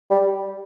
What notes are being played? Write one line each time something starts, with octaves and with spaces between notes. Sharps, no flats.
G3